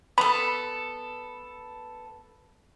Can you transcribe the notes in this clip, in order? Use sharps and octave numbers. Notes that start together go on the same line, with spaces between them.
B3 A4 B5